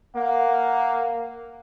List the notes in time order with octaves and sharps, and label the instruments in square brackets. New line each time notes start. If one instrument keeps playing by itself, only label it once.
[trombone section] A#3 [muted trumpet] F#5